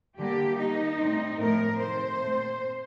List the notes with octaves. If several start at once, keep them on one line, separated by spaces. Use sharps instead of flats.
D3 G3 A#3 G4
D#3 A#3 D#4
A2 G3 C4
A2 F3 A3 C4 A#4
C3 D#3 A3 C4 C5
A#2 A3 C4